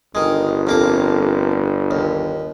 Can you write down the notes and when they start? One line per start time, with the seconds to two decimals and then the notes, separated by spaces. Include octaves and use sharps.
0.15 G1 D#3 G#3
0.67 F2 A#3 D6
1.91 D#2